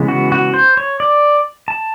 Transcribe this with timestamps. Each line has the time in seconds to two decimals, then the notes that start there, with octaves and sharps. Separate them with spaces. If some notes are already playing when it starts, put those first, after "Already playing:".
Already playing: C#3 E3 G#3 B3
0.08 F#4
0.32 F#4
0.54 C5
0.77 C#5
1.00 D5
1.68 A5